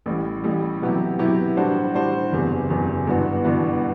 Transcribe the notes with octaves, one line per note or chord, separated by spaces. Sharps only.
A1 A2 G3
A1 A2 G3
C3 F#3 B3 E4 G4
C3 F#3 B3 E4 G4
A2 G3 D4 F#4 C5
A2 G3 D4 F#4 C5
F#1 E2 C3
F#1 E2 C3
G1 G2 E3 B3 F#4
G1 G2 E3 B3 F#4